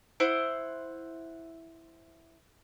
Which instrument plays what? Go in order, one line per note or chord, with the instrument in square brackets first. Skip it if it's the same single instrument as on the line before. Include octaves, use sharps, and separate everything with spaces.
[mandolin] E4 C5 F#5 C6